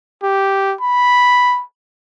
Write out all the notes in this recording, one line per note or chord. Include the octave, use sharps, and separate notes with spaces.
G4
B5